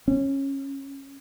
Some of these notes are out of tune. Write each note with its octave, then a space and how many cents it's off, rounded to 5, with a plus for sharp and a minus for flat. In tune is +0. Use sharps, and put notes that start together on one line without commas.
C#4 -15